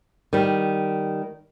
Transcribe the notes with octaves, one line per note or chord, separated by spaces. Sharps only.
D#3 G3